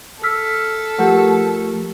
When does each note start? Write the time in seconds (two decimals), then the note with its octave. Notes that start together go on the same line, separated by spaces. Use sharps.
0.23 A4 E6 F6 B6
0.98 F3 A3 G4 A#4 F#5